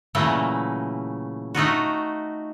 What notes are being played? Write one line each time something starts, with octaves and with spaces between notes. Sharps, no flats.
A#2 C#3 E3 F#3 A3 A#3
A3 D#4 F4 F#4